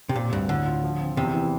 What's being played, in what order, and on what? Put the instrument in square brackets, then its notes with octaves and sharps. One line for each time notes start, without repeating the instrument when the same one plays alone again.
[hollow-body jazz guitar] C3
[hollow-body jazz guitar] A#2 [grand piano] C4
[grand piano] D2 [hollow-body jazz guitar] G2
[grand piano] A2 [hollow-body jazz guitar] D3
[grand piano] F4
F3
C4
[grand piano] E2 [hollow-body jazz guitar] C3
[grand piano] E3